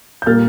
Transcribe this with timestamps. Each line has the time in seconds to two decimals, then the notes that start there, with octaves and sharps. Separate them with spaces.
0.22 G6
0.26 A#2 G3 A#3 F6 A6